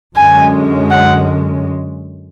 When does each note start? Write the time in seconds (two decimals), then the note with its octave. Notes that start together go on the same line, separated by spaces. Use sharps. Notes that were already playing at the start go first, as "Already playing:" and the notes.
0.16 F#2 D3 G#3 C#4 G#5
0.91 F#5